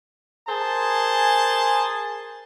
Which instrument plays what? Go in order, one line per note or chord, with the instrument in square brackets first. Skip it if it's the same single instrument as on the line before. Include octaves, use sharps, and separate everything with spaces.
[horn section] G#4 A#4 C5 G#5 A5